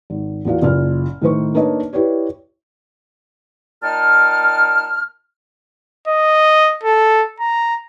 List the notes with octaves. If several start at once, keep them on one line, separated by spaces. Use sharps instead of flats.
G#1
E2 A#2 F#4 F5
F#1 A#2 F6
A2 D#3 D#4 C5 C#6
A#3 D4 D#4 B4 C#5 D#5
E4 G4 B4 C#5 D5
A#2 D#4 G5 A5 F6
D#5
A4
A#5